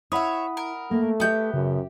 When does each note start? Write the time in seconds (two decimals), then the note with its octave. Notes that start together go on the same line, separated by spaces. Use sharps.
0.12 E4 C#5 E5 F#5 B5 D#6
0.57 A#4
0.91 A3 A#3
1.20 B3 G4 E5 G5 G6
1.54 F#2 C#3